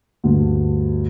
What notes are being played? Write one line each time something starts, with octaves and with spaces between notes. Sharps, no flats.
D2 G2